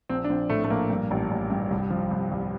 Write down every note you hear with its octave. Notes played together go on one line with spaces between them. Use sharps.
A#1 C4
D4
A#1 C4
A2 A3
A3
A#1 A#3
G2
A1
A1
G2
C2
F3
C2
C2